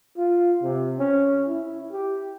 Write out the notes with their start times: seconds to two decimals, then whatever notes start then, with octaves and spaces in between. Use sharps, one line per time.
0.17 F4
0.63 C3
0.99 C#4
1.47 E4
1.92 G4